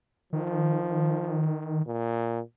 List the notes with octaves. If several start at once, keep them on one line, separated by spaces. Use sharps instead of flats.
D#3 F3
A#2